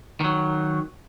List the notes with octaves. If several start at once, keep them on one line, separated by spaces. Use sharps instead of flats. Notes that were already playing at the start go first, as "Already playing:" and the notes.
D#3 F#3